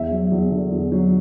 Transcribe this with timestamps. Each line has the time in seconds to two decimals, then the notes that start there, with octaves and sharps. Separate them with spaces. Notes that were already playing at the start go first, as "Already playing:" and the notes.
Already playing: E2 E5
0.11 F#3
0.32 E2
0.51 D3
0.72 E2
0.92 F#3